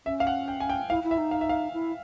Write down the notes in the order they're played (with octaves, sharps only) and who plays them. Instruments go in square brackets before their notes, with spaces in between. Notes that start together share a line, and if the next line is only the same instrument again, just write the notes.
[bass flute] C#4 [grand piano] E5
[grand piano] F5
F#5
G5
G#5
G5
[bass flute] E4 [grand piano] F5
[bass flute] E4
[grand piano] E5
[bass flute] D#4
[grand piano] F5
E5
F5
[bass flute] E4